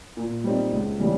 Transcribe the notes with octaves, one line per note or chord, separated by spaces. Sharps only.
A#2
G3 C4 D#4
C#2
C#3 E3 G3